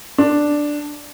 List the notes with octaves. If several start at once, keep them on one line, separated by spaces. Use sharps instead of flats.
D4